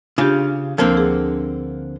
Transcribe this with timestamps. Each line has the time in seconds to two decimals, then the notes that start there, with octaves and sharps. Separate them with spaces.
0.18 C#3 D4 F4 G4
0.78 D2 D3 F3 A#3 C4
0.97 G#4